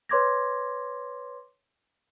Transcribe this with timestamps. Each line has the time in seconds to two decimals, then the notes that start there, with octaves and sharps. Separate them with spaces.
0.09 B4 C#5 C6 D6 G#6 A#6